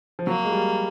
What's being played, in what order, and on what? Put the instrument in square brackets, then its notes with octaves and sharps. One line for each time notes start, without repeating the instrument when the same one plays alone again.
[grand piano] F3
[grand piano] F#3 [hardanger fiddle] A#3
[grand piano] G#3
G3